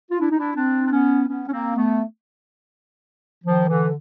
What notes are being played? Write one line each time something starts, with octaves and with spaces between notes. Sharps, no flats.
F4
D4 E4
D#4
D4 E4
C4 D4
D4
B3 C#4
B3 C#4
C#4
A#3 C4
A3 B3
D#3 F3
D3 E3